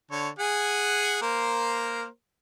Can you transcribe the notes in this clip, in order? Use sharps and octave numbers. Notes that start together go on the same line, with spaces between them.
D3 C#5 A5
G#4 F#5 G#5
A#3 A#4 C5